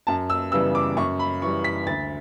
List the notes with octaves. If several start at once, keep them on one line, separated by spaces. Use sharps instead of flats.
F#2 A5
E6
C#3 E3 G3 B3 E6
D6
F#2 C#6
B5
E3 G3 C#6
B6
D2 A6